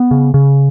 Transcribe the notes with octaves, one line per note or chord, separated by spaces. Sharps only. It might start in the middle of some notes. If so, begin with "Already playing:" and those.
Already playing: B3
C#3
C#3